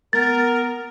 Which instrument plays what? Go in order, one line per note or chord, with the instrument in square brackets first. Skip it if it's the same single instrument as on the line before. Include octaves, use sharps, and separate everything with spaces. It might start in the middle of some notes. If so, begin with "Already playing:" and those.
[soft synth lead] B3 [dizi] A#4 [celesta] A6